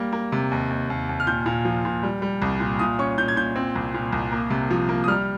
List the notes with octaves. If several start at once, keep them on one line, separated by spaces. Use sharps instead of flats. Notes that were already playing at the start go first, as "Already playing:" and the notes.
Already playing: G3 A#3
A#3
C3
D#2
D#2
D#2
D#2
F6
A#2 G6
A#2
F3
A#2
G3
G3
C2
A#2
A#2 D#6
C#4 C#6
A#2 G6
G#6
A#2 G6
C4
C2
A#2
C2
A#3
C3
F3
A#3
D#6
G3 F6